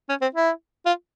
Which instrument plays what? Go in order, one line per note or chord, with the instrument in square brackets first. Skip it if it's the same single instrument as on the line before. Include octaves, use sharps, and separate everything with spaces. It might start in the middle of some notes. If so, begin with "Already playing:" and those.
[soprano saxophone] C#4
C4
E4
F4